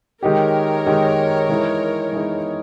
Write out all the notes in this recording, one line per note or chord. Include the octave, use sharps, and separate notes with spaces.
D#3 G#3 D#4 G4 A#4 C#5
D#3 G#3 D#4 G4
E3 G#3 D#4
E3 G#3 D#4